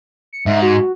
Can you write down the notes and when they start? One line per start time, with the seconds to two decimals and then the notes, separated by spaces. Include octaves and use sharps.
0.33 C#7
0.46 G#2 E5
0.62 F#4